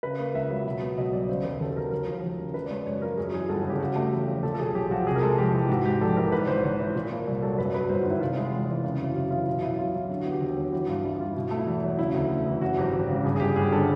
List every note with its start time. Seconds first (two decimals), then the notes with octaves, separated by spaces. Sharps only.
0.03 C#3 B4
0.19 A#3
0.34 C#2 E5
0.50 F#3
0.66 B2
0.82 B3
0.97 B1 D#5
1.13 G3 D5
1.29 C#3 C5
1.44 D#2 B4
1.60 D#2 A4
1.71 A4
1.76 F#3 A#4
1.91 D#2 A#4
2.07 F3
2.23 F1
2.39 C#3
2.54 C#3 B4
2.66 D5
2.70 G#3 C#5
2.86 F#2 C#5
3.02 F3 A#4
3.17 F#2 G#4
3.34 E3 G#4
3.49 G1 A4
3.60 C#3 G#4
3.70 G4
3.80 C#3 F#4
3.96 A3 G4
4.13 E2
4.28 F3
4.43 A#2 A4
4.54 A4
4.60 B1 G#4
4.75 B1 G4
4.91 F3 F#4
5.07 C3 G#4
5.15 A#4
5.22 G#3 A4
5.38 F2 G4
5.54 E3
5.69 G#2 F#4
5.85 G#3 G4
6.01 A#1 A4
6.16 E3 A#4
6.32 G#2 B4
6.47 G#1 C5
6.64 G#1 C#5
6.80 E3
6.95 A#2
7.11 A#3
7.27 C2
7.42 F#3 A4
7.58 F#2 B4
7.74 F#3 B4
7.89 G1 C5
8.00 F#4
8.06 D#3 E4
8.20 C3 F4
8.37 G#3
8.52 E2
8.69 E3
8.85 C#3
9.00 F#2 E4
9.15 F#2 F4
9.31 E3 F4
9.46 B2 F4
9.62 B1 E4
9.79 B1 F4
9.89 E4
9.94 F#3 F4
10.09 D3 F#4
10.21 B3 F#4
10.31 G4
10.41 D#2
10.57 F#3
10.72 E3 F#4
10.88 G2 F4
11.04 G2 E4
11.19 G3 F4
11.32 B2 E4
11.51 A3
11.57 E4
11.67 E2
11.83 F#3
11.99 C#3 E4
12.14 D2
12.31 D2
12.46 E3
12.61 F#2 F#4
12.77 G#1 G4
12.93 G#1
13.09 C#3
13.25 G2 G#4
13.36 G#4
13.40 G1 G4
13.56 G1 G#4
13.71 D3 A4